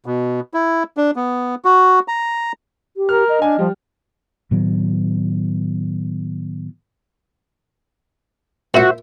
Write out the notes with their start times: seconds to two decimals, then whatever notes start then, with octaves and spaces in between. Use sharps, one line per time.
0.06 B2
0.54 E4
0.97 D4
1.16 B3
1.65 F#4
2.08 A#5
2.97 G4
3.09 A#4 F6
3.29 D#5
3.42 D4 G#5
3.59 F3 G3
4.51 A2 D#3 F#3 B3
8.74 A#2 E4 F#4 C5 E5